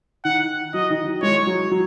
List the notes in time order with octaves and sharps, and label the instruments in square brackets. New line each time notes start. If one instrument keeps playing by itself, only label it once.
[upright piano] D#3 [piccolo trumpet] F#5
[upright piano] F#3 [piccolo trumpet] D#5
[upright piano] D#3
F#3
[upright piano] G#3 [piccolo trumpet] C#5
[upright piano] F#3
F#3